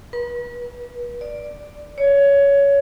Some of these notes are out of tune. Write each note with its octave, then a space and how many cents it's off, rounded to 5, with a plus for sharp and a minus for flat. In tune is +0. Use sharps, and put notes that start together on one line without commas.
B4 -40
D5 +5
C#5 +15